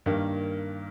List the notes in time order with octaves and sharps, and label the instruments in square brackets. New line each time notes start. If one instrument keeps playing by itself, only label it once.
[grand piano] G2 D#3 A#3